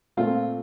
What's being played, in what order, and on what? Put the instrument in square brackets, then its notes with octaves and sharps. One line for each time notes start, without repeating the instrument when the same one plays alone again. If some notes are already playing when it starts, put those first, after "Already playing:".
[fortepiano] A#2 A3 C4 F4